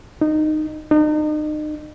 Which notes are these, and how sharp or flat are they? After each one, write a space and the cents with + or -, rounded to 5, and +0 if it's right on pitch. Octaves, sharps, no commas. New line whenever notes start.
D#4 -15
D#4 -35